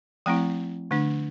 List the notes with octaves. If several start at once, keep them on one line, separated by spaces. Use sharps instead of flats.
F3 A3 C4 E4 G5
D3 A3 D4